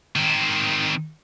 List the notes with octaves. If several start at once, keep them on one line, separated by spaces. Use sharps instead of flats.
D#3 C4